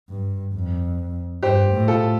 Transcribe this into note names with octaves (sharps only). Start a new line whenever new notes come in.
G2
F2
G2 G4 C5
A2
F4 A4